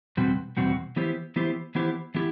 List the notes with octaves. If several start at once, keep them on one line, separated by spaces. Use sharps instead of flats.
E2 B2 G3 C4 F#4
E2 B2 G3 C4 F#4
E3 B3 E4 G4 C5
E3 B3 E4 G4 C5
E3 B3 E4 G4 C5
E3 B3 E4 G4